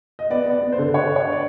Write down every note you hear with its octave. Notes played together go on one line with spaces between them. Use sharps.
D#5
B3 D5
B3
D5
B3
C5
D3
D3 C#5
D3
C#5
D5